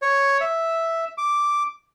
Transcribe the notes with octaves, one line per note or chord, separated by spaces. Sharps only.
C#5
E5
D6